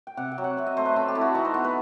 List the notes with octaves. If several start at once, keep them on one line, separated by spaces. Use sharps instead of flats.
G5
C3 F#5
G5
F#3
F#5
C4 E5
D#5
A3 C5
B4
C4 A4
G4
A3 E4
F#4
E3 D#4
C5
B3
B4